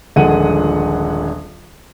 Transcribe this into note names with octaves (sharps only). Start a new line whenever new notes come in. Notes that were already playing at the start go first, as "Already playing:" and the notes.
D#1 A#1 D3 G#3 F#5 D#7